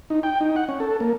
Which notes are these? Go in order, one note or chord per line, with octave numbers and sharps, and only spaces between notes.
D#4
G5
D#4
F#5
C#4
A4
A#3